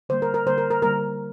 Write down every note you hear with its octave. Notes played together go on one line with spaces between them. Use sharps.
D3 G3 A#3 C5
A#4
A#4
D3 G3 A#3 C5
A#4
A#4
D3 G3 A#3 A#4